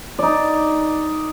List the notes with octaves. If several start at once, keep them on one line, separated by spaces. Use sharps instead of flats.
D#4 D5